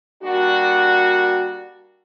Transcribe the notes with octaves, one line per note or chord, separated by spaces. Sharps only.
G3 A#3 D4 F#4